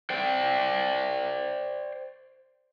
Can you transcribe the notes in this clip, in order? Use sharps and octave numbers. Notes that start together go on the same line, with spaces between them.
C5 D5 G5